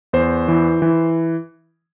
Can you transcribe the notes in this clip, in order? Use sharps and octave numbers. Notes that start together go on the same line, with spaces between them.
E2 C5
E3
E3